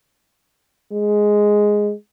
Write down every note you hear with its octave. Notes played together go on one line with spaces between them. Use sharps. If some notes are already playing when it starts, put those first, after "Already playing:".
G#3